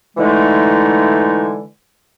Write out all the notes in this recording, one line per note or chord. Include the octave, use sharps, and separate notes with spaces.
D3 E3 G#3 A3 D#4